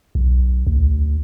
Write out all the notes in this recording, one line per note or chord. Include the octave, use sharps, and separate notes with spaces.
B1
D2